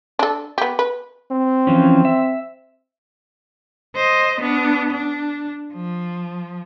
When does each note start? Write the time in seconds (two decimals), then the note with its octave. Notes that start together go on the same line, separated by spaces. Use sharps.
0.19 D4 A4
0.58 B3 G4
0.79 B4
1.31 C4
1.67 E3 F3 C#4
2.05 E5
3.96 C5 D#5
4.41 B3 D4
4.91 D4
5.74 F3